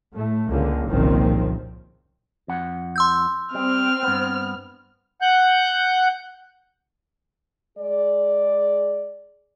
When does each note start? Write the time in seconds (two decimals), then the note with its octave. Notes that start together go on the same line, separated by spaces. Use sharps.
0.16 A2 A3
0.50 C#2 D3 A#3
0.88 F#1 C2 A#2 D#3 F3 C4
2.48 F2 F#5
2.96 C6 E6 G6
3.55 G3 C4 F6
4.03 G2 B3
5.22 F#5 F#6 G6
7.78 G#3 G#4 D5